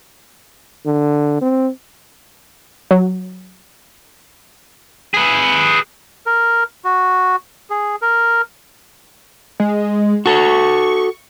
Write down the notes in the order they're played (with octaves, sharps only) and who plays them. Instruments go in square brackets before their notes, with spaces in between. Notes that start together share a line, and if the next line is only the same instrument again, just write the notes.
[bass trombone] D3
C4
[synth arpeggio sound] F#3
[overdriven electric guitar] G#4 B4
[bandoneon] A#4
F#4
G#4
A#4
[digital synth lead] G#3
[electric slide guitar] F#4 A4 [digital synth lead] C#6